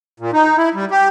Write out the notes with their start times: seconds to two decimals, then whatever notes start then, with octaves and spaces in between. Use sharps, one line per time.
0.20 A#2
0.33 D#4
0.57 E4
0.74 G3
0.91 G4